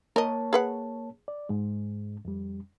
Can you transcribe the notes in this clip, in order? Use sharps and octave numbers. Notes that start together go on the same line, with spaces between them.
A#3 A#4 C#5 D#5 A5
G#4 B4 F#5
D5
G#2 G#3
F2 G3